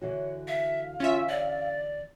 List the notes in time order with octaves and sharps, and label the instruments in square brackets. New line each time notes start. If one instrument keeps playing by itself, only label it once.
[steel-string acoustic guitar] D3 E3 F#4 [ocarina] C#5
[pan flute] E5 [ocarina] F5
[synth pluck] C#4 E5 [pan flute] F4
[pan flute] D5